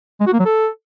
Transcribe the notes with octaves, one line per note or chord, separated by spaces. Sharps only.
G#3
F#4
A#3
F#3
A4